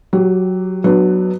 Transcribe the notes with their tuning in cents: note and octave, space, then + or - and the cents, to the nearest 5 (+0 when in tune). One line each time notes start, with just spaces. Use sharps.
F#3 +0 G4 -15
F#3 +0 B3 +0 D4 +30